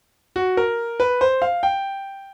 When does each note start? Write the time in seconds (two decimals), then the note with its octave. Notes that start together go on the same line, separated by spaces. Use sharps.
0.36 F#4
0.57 A#4
1.00 B4
1.21 C5
1.42 F5
1.63 G5